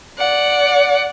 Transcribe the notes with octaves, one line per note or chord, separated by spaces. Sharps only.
D5 F#5